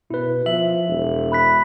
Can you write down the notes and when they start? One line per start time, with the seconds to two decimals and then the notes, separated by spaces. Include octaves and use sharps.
0.10 B2 E4 B4
0.46 F3 E5 F#7
0.88 E1
1.32 B5 F#6 B6